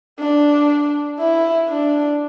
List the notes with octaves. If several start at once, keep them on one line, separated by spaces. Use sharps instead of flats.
D4
E4
D4